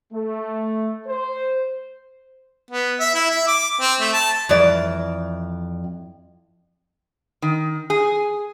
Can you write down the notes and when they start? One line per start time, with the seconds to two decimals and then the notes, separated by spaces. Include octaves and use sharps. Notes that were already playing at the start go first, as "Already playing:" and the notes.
0.13 A3
1.06 C5
2.71 B3
3.00 E5
3.14 E4
3.31 E5
3.47 D6
3.81 C4
4.01 A3
4.13 A5
4.49 F2 E3 D5
7.42 D#3
7.90 G#4